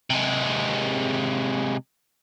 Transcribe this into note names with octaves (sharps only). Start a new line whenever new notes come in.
C3 G#3